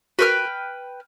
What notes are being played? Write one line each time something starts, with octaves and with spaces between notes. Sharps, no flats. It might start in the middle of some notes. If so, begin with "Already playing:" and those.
F#4 A#4 B4 G5 F6